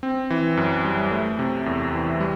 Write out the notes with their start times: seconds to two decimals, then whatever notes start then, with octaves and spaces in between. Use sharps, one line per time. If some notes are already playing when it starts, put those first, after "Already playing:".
0.03 C4
0.30 E3
0.57 F#2
0.85 G3
1.12 A3
1.39 C3
1.66 E2
1.93 E3
2.20 G3